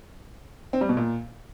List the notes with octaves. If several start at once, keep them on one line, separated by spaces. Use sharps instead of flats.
C4
G3
B2
A#2